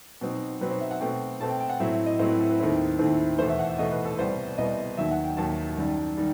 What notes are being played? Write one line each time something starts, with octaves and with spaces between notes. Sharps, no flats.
B2 F#3 C4 D#4
B2 F#3 C4 D#4 B4
C5
E5
F#5
B2 A3 C4 G5
B2 A3 C4 A5
G5
G5
F#5
A2 F#3 C4 E4 E5
D#5
A2 F#3 C4 E4 C5
B4
A4
B4
D#2 D#3 A3 C4 E4
D#2 D#3 A3 C4 E4
E2 B2 A3 C5
E5
F#5
E5
E2 B2 A3 D#5
B4
A4
C2 B2 G3 B3 C5
C2 B2 G3 B3 D#5
D#2 D#3 F#3 E5
F#5
G5
D#2 D#3 F#3 A5
F#2 D#3 G3
D#3 G3